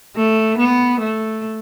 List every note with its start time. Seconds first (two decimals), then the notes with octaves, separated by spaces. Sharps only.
0.16 A3
0.58 B3
1.00 A3